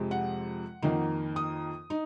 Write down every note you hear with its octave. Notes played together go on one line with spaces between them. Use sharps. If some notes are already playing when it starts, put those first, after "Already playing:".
Already playing: F2 C3 F3 G#3
F#5
F2 D#3 A#3 D#4
D#6
D#4